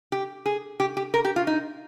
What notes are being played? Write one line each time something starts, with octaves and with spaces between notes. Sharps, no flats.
G4
G#4
G4
G4
A#4
G4
F4
D#4